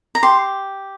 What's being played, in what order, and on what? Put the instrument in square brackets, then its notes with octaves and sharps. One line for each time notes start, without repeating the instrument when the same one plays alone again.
[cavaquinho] A#5
G4 C6